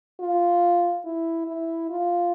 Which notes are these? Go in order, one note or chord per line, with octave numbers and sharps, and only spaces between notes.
F4
E4
E4
F4